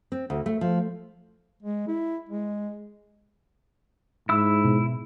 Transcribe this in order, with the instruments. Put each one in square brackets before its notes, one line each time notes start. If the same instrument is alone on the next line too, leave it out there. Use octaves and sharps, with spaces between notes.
[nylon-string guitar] C4
D2
A3
F3
[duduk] G#3
E4
G#3
[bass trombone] G#2 [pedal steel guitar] E4 E6
[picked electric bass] B2